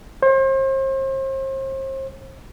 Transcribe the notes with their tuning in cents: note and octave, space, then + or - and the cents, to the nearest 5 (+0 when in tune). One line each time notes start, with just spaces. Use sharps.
C5 +40